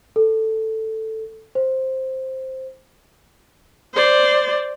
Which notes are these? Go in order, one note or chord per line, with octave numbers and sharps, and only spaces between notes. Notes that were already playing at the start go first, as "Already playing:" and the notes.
A4
C5
C5 D5